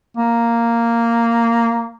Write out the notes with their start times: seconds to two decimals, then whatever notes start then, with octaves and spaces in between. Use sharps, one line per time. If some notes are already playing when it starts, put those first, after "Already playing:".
0.17 A#3